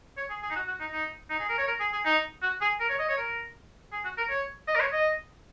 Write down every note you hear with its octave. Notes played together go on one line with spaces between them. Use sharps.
C#5
G#4
G#4
D#4
F#4
F#4
D#4
D#4
D#4
G#4
A#4
C#5
A#4
G#4
G#4
D#4
F#4
G#4
A#4
C#5
D#5
C#5
A#4
G#4
F#4
A#4
C#5
D#5
A#4
C#5
D#5